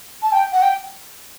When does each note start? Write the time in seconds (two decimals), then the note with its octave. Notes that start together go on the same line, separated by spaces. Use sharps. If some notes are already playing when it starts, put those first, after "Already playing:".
0.22 A5
0.32 G5
0.53 F#5
0.62 G5